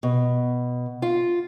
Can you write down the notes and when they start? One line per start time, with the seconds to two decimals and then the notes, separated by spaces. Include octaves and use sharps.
0.03 B2
1.02 F4